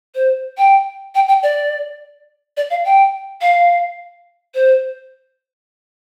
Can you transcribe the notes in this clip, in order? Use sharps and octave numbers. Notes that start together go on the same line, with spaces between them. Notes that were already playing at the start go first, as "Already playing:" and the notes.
C5
G5
G5
G5
D5
D5
F5
G5
F5
C5